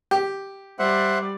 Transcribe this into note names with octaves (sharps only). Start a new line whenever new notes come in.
G4
G3 C5 D5 E5 F#5